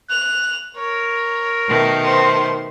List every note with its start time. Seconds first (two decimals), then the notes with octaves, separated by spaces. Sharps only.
0.10 F#6 F7
0.76 A#4 C#5
1.66 B2 D#3 A3
2.04 C5 C6